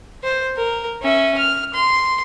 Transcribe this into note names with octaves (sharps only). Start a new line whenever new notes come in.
C5
A#4
C#4 E5
F6
C6